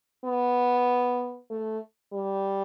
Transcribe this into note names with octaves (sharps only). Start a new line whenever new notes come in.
B3
A3
G3